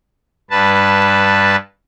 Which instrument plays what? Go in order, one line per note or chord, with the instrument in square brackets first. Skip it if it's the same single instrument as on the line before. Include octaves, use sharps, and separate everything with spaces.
[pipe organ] G2 B4 A5